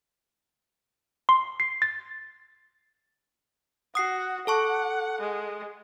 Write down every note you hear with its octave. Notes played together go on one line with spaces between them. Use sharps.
C6
C7
A6
F#4 D#6 C7
A4 F#5 A5 C#6
G#3